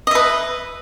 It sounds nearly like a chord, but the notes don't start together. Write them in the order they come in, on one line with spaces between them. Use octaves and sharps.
D#5 E5 B4